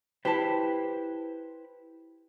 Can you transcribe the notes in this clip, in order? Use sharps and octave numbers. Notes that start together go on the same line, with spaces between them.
E4 G4 B4 C5 A5